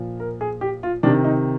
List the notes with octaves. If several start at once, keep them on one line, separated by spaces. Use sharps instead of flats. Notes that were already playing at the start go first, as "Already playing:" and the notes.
Already playing: A#2 F3
A#4
G#4
G4
F4
C3 D#3 D4
D#4